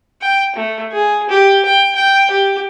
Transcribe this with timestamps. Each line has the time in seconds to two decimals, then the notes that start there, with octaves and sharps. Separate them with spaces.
0.22 G5
0.56 A3
0.92 G#4
1.29 G4
1.65 G5
1.95 G5
2.31 G4